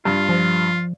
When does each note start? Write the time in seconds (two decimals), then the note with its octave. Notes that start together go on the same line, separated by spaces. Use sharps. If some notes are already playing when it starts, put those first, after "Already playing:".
0.05 G2 F4
0.29 F3